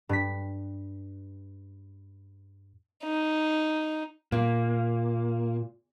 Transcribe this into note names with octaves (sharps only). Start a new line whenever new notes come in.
G2 B6
D#4
A#2 A#3